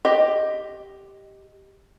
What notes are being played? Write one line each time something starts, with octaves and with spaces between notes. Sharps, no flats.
G4 D#5